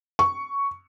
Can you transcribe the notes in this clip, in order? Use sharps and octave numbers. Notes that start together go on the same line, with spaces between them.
C#6